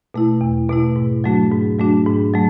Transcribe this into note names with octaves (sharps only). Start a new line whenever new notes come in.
B2 A3 E4
E2
B2 A3 E4
G#2
F#3 A3 D4 F#4
G#2
F#3 A3 D4 F#4
G#2
F#3 A3